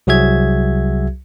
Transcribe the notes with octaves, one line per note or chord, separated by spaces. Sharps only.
C2 F#3 F#4 G#4 E5 G#6